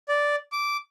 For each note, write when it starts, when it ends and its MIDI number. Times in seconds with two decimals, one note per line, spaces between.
0.09 0.36 74
0.52 0.77 86